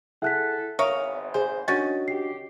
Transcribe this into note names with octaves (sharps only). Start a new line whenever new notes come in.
E4 G#4 A4 E5 F#5 F#6 B6
G#1 E2 G#2 A#4 C#5 E5 F5 D#6
G#4 C5 G#5
D#3 C#4 D4 F#4 D#5 A6
G4 C7